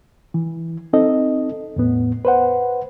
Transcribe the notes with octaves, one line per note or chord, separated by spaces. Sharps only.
E3
C4 D#4 A4 D#5
E2 A2 B3
B4 C5 F#5